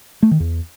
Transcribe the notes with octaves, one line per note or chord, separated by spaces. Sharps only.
A3
D#3
E2